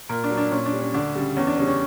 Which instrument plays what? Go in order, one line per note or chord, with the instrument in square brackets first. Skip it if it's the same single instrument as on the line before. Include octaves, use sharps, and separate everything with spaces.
[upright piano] A#2 A#4
D4
F#3
D4
A#2 C#4
D4
G3
C#4
D2 D4
C#3 G3
E2 C#4
D4
C#3 G3 C#4
C#4